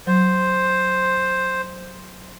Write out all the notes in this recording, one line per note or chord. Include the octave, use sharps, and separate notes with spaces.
F#3 C5